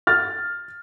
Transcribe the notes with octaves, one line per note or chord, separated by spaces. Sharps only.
F6 A6